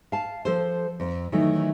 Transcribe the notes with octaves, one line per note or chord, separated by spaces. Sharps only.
F5 A5
F3 A4 C5
F2
D#3 E3 F#3 A3 D#4